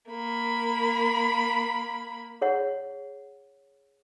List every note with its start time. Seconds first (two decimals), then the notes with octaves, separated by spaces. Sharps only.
0.10 A#3 B5
2.42 G#4 C#5 F#5